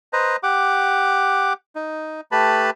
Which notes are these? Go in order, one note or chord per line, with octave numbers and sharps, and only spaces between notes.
B4 C5 D#5 A#5
G4 F#5 D6
D#4
A3 G4 B4 A5 B5